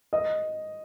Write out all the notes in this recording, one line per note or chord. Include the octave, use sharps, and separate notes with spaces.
D#5